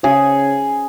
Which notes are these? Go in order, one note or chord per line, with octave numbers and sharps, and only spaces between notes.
C#3 G#4